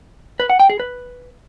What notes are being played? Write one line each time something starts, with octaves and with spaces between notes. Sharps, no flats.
B4
F#5
G5
G#4
B4